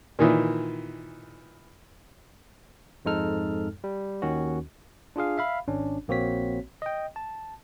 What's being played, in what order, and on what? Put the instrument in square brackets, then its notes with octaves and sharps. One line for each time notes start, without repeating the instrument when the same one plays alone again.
[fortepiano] A#2 D#3 E3
[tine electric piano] F2 G#2 G#3 D#4 A4 F6
G3
D#2 D#3 C#4 F#4
D4 F4 G#4 F5
E5 F5 B5
G#1 C#4 D4
A#1 A#3 C4 F#4 C#5 B6
D#5 G5
A5